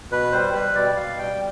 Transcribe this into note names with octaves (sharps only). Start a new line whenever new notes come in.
B2 B4
G3 C5
G3 B4
B2 D5
B2 F5
G3 G5